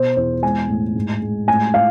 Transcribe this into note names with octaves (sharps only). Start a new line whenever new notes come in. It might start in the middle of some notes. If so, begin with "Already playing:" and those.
Already playing: B2 C5
E2 C5
G#3 G#5
A2
G#2
G#3
A2 G#5
A2 F5